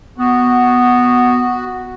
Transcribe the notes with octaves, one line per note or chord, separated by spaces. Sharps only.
B3 F#4